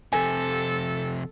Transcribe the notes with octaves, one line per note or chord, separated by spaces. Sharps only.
F2 C3 A4 G#5